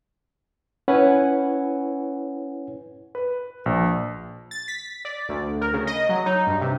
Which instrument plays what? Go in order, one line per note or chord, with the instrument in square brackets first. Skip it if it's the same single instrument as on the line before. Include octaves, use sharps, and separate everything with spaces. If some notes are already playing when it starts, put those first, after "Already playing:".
[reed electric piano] C#4 E4 B4 C#5 F#5 G#5
[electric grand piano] B4
A#1
[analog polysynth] A6
B6
D5
D2
A#4
C#3
D#5
F#3
D#4
G2
C3